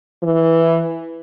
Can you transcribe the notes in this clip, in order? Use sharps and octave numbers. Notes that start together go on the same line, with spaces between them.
E3